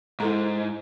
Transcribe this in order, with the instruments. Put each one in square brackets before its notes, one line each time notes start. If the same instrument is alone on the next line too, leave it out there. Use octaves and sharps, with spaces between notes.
[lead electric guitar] G#2 [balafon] E4 A4 A#5